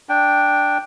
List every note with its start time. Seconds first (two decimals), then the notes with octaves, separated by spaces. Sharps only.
0.09 D4 G5